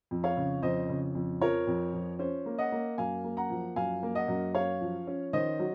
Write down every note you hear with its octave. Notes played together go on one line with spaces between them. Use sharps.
F2
C#5 F5
C#3
F2 C5 D#5
C#3
F2
F3 A#4 C#5
F2
F3
C#4 C5
A#3
D#5 F#5
A#3
F#2 F5 G#5
A#3
F#5 A#5
F3
F#2 F5 G#5
A#3
D#5 F#5
F#2
C#4 C#5 F5
F3
C#4
D#3 C5 D#5
F#3